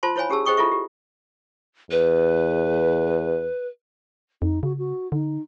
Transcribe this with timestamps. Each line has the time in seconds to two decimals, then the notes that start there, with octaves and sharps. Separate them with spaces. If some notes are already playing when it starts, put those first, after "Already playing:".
0.03 F4 C5 A5 C6
0.16 E4 C5 C#5 F5 G#5 B5
0.30 C#4 G4 G#4 A5 E6
0.45 G#4 C5 D#5 G5 C#6 D#6
0.57 E4 F4 A4 E5 C#6
0.72 G4
1.91 E2 B4
4.42 F2 D#4
4.63 C#3 F#4
4.78 F#4
5.12 D3 D#4